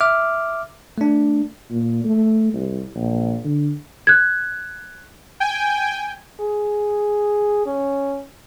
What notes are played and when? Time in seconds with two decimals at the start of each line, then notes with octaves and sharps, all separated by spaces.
0.01 E5 D6 F6
0.98 A3 D4
1.70 A#2
2.04 A3
2.54 C2
2.96 A#1
3.44 D3
4.07 F#6 G#6
5.40 G5 G#5
6.41 G#4
7.66 C#4